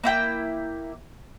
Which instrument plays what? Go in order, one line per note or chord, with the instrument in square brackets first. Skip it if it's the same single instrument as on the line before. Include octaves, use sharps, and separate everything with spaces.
[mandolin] A#3 E4 G5